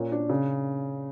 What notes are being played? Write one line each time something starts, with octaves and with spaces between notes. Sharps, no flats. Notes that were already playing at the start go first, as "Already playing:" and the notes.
Already playing: A#2 C#4
D4
C#3